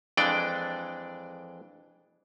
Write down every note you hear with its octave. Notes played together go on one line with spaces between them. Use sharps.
F2 E3 G#3 D4 D5 G5